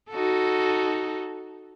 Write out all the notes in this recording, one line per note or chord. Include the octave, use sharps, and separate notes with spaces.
D#4 F#4 A4